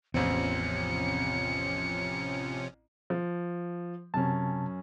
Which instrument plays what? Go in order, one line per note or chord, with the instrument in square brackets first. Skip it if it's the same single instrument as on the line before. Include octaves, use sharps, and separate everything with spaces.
[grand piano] A1 C4 [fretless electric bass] E2 [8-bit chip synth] C3 F3 C#4 [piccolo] C#7
[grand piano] F3
[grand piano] F#2 C#4 [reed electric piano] C3 A5